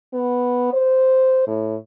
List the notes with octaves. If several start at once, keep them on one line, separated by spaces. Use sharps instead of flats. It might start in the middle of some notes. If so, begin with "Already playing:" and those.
B3
C5
A2